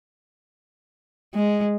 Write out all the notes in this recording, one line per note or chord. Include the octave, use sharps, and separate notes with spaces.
G#3